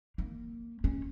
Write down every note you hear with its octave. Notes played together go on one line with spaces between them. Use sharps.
A#3
C#4